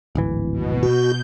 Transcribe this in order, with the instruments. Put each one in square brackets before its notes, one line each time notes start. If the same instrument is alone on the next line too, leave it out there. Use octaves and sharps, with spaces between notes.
[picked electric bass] D1 G#1 E3
[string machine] B2
[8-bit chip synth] F#4 [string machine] G6